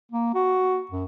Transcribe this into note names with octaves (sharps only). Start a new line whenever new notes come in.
A#3
F#4
F#2